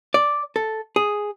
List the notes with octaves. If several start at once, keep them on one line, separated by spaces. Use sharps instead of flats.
D5
A4
G#4